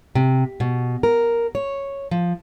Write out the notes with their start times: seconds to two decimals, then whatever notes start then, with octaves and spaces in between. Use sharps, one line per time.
0.15 C3
0.60 B2
1.03 A#4
1.55 C#5
2.11 F3